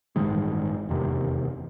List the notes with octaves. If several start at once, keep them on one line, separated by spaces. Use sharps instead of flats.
A1 G2 D#3 G#3
F1 E2 C3 D#3